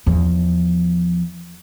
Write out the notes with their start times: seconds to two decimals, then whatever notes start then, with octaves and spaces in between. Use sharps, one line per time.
0.06 E2 F3